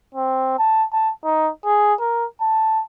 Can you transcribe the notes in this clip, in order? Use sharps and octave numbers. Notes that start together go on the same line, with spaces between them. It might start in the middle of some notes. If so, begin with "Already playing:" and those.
C4
A5
A5
D#4
G#4
A#4
A5